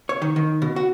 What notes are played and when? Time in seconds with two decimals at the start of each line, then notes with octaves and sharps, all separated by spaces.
0.09 C#5
0.22 D#3
0.36 D#3
0.62 B2
0.76 F#4